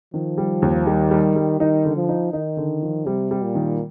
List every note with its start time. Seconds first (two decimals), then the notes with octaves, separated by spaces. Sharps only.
0.14 D#3 F3
0.38 G3
0.62 D#2
0.87 D#3 G3
1.11 G3
1.36 G3
1.60 D#3 D#4
1.85 D3
1.96 F3
2.09 D#4
2.33 D#3 D#4
2.57 D3
2.82 F3
3.06 C3 G3
3.31 G3
3.43 A#2
3.55 D#3